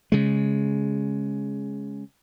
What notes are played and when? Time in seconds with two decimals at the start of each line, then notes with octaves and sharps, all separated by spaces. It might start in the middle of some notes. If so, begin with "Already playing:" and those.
0.12 C#3 G#3